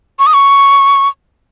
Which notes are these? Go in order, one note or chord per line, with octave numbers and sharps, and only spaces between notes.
C#6
D#6
C#6